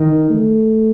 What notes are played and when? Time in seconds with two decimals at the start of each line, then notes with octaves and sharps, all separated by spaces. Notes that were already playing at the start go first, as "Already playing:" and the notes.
Already playing: D#3
0.30 A3